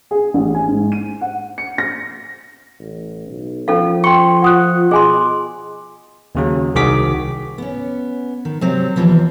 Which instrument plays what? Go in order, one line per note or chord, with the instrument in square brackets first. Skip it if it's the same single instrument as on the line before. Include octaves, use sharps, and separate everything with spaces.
[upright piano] G#4
A1
G#5
G#2
D#7
F#5
C#7
A#6
[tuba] A1
B1
[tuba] F3 [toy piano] C#4 A4 F5
[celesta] G5 C#7 [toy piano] C6 C#6
[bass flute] F4 [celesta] F#5 D#6 F#6
[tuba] B2 [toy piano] G#4 G#5 C6 [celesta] D#5
[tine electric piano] D#2 C#3 F#3
C2 D#3 F#4 G#4 D6 B6
[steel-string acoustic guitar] B3 C#4
D#3
C3 F#3 C4
D#2 C3 E3 F3 B3